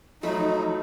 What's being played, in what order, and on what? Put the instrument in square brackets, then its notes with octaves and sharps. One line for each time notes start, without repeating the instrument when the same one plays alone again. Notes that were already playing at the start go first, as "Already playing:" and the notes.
[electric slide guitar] F3 F#3 [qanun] A3 B5 [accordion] D#4 [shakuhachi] D#5